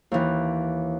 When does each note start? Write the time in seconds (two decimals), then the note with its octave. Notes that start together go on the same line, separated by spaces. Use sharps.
0.12 D#2 E3